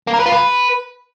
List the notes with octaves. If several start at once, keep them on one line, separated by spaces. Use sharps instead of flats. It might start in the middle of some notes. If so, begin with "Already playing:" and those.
A#3
A#4
B4
F4
B4